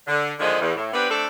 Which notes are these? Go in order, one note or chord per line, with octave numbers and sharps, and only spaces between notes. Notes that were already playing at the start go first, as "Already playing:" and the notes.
D3
D3 D#3 F3 G#3
E2
A2
B3 C4 D4 G4 B4
A3 C4 D4 A4